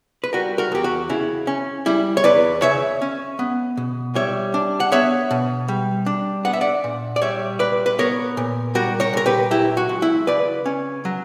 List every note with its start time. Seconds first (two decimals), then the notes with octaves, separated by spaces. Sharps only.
0.24 B4
0.33 G3 F#4 A#4
0.58 F#4 A#4
0.72 E2 G4
0.84 F#4
1.09 C#3 E4
1.47 C#4
1.86 G3 E4
2.17 C#5
2.24 E2 B4 D5
2.62 C#3 C#5 E5
3.02 C#4
3.39 B3
3.77 B2
4.15 G3 C#5 E5
4.54 D4
4.80 F#5
4.92 B3 C#5 E5
5.31 B2
5.68 G3
6.06 D4
6.45 B3 F#5
6.53 E5
6.61 D5 F#5
6.84 A#2
7.16 D5
7.22 G3 C#5 E5
7.59 A#2 B4 D5
7.86 B4
7.99 B3 A#4 C#5
8.37 A#2
8.75 G3 F#4 A#4
9.00 A#4 C#5
9.13 A#2 A#4
9.26 G4 B4
9.51 F#3 E4 G4
9.77 F#4
9.89 C#2
10.02 E4
10.27 C#3 B4 D5
10.66 C#4
11.05 F#3